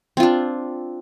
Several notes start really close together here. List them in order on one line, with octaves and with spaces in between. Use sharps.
C4 F4 D4